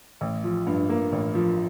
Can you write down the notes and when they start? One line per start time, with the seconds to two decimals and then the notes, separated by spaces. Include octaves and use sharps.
0.21 A1
0.44 F3
0.67 G2
0.89 A#3
1.12 A1
1.35 F3